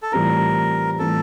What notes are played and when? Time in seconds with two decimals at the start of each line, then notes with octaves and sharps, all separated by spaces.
0.02 A4
0.12 A2 E3 G3 C4 F4 A#4
0.99 A2 E3 G3 C4 F4 A4